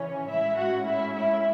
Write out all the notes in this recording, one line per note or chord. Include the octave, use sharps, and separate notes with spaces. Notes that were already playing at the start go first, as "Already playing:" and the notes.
Already playing: C#3 E3 C#4 C#5
A2 G#3 C#4 E4 E5
F#4 F#5
E4 E5
E4 E5